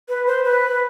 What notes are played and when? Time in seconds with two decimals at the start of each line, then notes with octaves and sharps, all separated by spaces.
0.09 B4
0.27 C5
0.44 B4